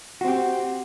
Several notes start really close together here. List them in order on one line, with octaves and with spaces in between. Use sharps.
F#4 C4 G4